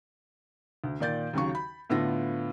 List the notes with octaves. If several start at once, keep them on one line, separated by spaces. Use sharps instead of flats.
D2
A#2 D#3 D5 G6 A6
D#2 C#3 F#3 C#6
B5
A2 D3 B3 F4 A#6